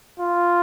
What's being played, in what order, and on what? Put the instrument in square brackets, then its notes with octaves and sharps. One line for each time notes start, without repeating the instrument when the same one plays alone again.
[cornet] F4